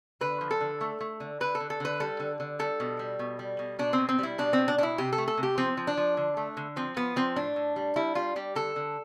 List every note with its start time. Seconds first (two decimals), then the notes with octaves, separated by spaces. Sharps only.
0.21 D3 B4
0.41 F3
0.51 A4
0.61 D3
0.81 A3
1.00 A3
1.20 D3
1.40 D3 B4
1.55 A4
1.60 D3
1.70 A4
1.80 D3 B4
2.00 G3 A4
2.20 D3
2.40 D3
2.59 G3 A4
2.80 B2
2.99 G3
3.19 B2
3.39 G3
3.59 B2
3.79 B2 D4
3.93 C4
3.98 B2
4.09 C4
4.19 G3 E4
4.38 B2 D4
4.53 B2 C4
4.68 D4
4.78 B2 D4
4.83 E4
4.98 C3 G4
5.13 A4
5.18 A3
5.28 A4
5.37 C3
5.43 G4
5.58 F3 C4
5.77 F3
5.87 D4
5.97 F3
6.17 D3
6.37 A3
6.57 D3
6.76 F3 C4
6.96 F3 B3
7.16 F3 C4
7.36 A2 D4
7.56 A2
7.76 G3
7.96 G3 E4
8.15 G3 F4
8.36 G3 G4
8.55 D3 A4
8.76 D3